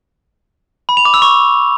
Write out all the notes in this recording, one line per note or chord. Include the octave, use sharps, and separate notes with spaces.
B5
F7
D6
E6
C#6